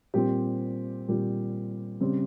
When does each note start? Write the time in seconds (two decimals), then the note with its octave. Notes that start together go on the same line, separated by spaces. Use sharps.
0.14 A#2 G3 C4 G4
1.08 A#2 G3 C4
2.01 C#3 G3 C4